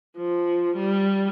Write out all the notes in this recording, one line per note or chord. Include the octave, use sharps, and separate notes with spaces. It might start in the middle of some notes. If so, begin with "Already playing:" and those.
F3
G3